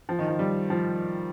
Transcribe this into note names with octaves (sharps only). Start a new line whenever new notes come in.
F3
D#3
F3
G3
F3